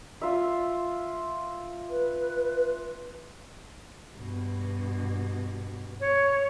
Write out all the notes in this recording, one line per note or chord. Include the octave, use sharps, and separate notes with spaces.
F4 E5
B4
G2 B2
C#5